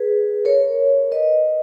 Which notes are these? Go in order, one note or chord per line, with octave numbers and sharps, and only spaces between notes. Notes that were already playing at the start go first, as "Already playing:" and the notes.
Already playing: G#4 B4
A#4 C#5
B4 D#5